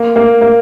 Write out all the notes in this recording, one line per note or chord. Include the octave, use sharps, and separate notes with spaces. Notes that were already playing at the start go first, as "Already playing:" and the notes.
Already playing: A#3
A#3
A#3